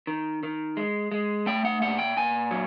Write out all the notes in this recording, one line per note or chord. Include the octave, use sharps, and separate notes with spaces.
D#3
D#3
G#3
G#3
A3 G5
F#5
A#2 F#5
G5
A#2 G#5
F#3